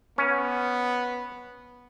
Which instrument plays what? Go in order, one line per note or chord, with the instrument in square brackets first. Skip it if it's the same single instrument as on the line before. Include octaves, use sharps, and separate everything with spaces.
[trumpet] B3 [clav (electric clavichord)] C#4